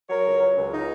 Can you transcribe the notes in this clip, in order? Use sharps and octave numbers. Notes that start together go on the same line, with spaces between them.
F#3 A#4 C#5
C#2
F#3
C#2
D#4